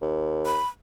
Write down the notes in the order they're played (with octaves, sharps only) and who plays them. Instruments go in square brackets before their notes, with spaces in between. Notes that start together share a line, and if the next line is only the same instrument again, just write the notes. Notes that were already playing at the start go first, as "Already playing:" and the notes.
[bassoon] D#2
[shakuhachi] B5